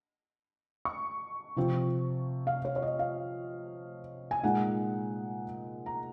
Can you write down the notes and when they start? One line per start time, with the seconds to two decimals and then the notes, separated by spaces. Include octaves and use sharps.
0.85 C#6
1.56 C3 F3 C4 F4
2.47 F5
2.65 C#5
2.76 C#5
2.82 D#5
2.99 F5
4.31 G#5
4.43 A#2 G#3 D#4 F#5
5.86 A#5